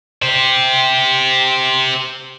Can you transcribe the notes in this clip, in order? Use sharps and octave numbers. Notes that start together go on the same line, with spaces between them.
G4 C5